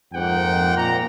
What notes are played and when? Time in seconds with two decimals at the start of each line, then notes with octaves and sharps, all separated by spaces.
0.13 F2 G#2 A#3 F#5 G5
0.77 A#2 A#5